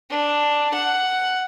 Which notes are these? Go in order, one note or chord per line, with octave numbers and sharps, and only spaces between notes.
D4
F#5